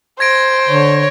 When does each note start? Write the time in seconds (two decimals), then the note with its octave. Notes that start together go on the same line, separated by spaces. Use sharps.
0.20 C5 G#6 A#6 D7
0.69 D3 C#5